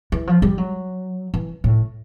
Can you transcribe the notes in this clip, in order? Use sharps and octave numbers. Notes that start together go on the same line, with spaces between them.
E3
F3
G3
F#3
E3
A2